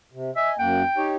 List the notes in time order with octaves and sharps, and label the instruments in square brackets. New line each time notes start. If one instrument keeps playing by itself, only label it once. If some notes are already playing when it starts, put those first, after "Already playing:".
[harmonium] C3
[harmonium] D#5 G#5 [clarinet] E5
[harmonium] F#2 A#3 F#5 [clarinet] G5
[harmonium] D#4 G4 C#5